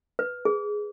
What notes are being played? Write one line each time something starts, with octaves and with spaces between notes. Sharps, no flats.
B4
G#4